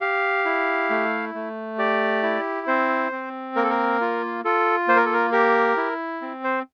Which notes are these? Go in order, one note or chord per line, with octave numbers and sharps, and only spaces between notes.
G4 F5
E4
A3
A3
G4 D5
E4
C4 C5
C4
A#3 A#4
A4
A#4
F4
F4 A4
A#3 C5
A#4
A4
A#4
G4 A#4
E4
C4
C5